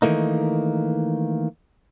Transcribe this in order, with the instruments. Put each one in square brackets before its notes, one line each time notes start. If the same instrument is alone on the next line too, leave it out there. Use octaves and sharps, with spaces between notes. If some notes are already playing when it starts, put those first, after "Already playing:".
[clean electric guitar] D#3 E3 A3 A#3 D#4